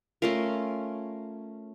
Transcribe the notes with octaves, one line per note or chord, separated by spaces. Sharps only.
A3 C#4 F4 A#4